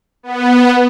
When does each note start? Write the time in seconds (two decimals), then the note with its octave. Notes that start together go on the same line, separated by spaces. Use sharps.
0.23 B3